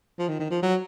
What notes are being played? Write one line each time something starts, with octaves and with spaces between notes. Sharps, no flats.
F3
D#3
D#3
F3
F#3